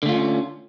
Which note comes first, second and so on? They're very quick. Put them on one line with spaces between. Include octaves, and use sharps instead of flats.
D3 A3 F4 C#4